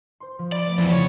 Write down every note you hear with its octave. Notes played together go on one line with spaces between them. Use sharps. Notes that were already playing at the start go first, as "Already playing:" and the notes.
C5 C6
F3
D5 B5 D6 A6
A3 B3
F2 E3
C#3 C#5 B6